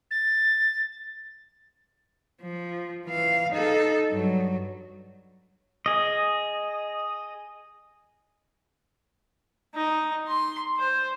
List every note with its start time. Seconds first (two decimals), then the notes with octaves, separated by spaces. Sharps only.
0.11 A6
2.42 F3
3.06 E3 F5
3.52 D#4 A4
4.10 G2 F#3
5.86 G#4 D#5
9.75 D#4
10.27 C6
10.78 C5